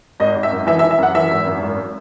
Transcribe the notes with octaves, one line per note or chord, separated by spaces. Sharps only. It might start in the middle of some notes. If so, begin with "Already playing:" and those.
G#1 D#5
G#1
E5
F#2
E3 E5
E5
E3
E5
F#2 F#5
E3 E5
G#1
F#2
G#1